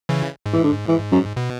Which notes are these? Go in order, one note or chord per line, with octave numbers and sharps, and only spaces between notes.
C#3 E3
G#2
E3
D3
E3
F#2
B2